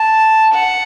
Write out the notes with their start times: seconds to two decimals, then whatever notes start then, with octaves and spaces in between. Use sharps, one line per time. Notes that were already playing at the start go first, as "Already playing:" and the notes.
Already playing: A5
0.54 F#5